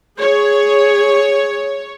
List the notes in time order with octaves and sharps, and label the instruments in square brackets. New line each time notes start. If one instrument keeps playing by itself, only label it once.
[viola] G#4 [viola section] C#5